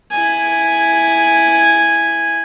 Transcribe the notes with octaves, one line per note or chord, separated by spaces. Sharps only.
E4 G#5